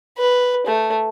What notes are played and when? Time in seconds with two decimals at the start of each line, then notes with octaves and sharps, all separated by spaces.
0.18 B4
0.67 A3